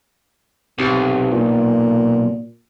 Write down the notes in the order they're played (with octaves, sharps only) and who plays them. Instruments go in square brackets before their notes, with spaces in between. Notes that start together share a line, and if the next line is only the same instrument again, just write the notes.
[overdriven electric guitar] B1 [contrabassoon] C3
[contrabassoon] A#2